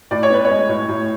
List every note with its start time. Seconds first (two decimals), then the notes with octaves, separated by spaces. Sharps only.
0.11 A2 D5
0.23 C#5
0.30 B3 B4
0.45 C#5
0.50 G#3
0.69 A2
0.89 A2